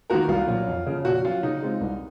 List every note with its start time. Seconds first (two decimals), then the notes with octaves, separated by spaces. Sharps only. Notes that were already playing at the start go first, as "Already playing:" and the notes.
0.10 D#3 A#3 F4 F#4 A#4
0.28 C2 F4
0.48 A#2 F#3
0.67 F2
0.87 C#3 F3
1.05 A#2 F#4
1.25 F#3 C#4 F4
1.43 C#3 D#4
1.62 G#3 C4 F4
1.81 C2